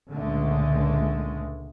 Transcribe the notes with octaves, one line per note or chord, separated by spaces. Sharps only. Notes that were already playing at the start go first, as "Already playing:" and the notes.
C#2 A#2 D3 G#3 A3